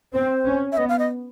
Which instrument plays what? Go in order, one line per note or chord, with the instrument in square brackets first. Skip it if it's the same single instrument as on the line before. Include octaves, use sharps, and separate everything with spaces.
[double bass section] C4 [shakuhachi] C5
[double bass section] C#4
[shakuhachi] E5
[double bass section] B3 [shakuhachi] D#5
[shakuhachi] F5
D#5